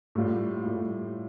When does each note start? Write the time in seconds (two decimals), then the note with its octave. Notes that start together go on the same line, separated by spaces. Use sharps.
0.15 A2 G3 F4
0.63 A2 G3 F4